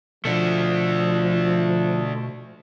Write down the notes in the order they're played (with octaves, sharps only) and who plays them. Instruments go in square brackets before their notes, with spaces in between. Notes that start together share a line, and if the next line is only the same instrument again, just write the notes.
[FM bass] B2 [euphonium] F3 [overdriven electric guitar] A3 D4